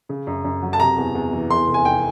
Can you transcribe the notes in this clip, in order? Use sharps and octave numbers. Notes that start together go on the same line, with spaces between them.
C#3
F#2
F#2
F#3
A5
C3 A#5
E2
E2
E3
E2 C6
F1
G#5
F1 G5